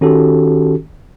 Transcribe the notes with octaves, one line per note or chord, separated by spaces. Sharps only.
D#3 C#4 F#4 G4 A4